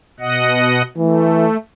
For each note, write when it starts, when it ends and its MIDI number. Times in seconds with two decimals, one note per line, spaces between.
0.20 0.82 47
0.20 0.82 75
0.20 0.82 78
0.97 1.46 52
0.97 1.57 57